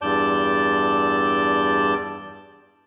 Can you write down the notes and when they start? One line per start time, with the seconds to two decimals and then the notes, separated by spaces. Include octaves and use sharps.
0.02 E2 G2 D5 A5 G6